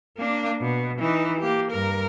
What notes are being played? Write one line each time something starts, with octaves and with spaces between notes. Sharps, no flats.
A#3 D4
B2
E3 D#4
A#3 G4
G2 A#4